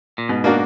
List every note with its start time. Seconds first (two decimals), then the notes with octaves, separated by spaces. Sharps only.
0.18 A#2
0.29 G#2 B2
0.44 A#3 D4 F#4 A#4